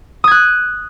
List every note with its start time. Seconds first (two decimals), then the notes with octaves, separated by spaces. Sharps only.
0.24 D#6
0.28 G#6
0.31 F#6